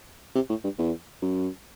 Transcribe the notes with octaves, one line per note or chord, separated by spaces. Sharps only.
C3
A2
G2
E2
F#2